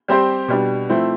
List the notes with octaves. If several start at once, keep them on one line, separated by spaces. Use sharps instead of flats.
G3 C4 G4 C5
B2 G3 D4
F3 A3 C4 E4